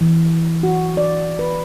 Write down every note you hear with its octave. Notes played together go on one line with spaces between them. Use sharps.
E3
F#4
D5
B4